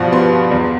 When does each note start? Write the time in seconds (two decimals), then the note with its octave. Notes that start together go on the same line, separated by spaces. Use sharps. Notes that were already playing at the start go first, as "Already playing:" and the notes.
Already playing: G2 B2 F3
0.12 B3 C6
0.32 F4
0.51 E2